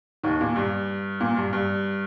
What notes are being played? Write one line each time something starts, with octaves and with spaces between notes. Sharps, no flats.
D#2 D#3
A#2
G2
A#2
G2
G2